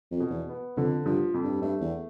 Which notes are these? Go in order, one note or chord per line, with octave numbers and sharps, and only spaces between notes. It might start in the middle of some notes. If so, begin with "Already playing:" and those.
F2
B2
E2
B3
F2 D3
G2 F3
F2
G2
G2 A3
E2